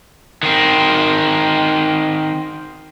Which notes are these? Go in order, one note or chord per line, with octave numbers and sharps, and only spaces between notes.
D#3 C4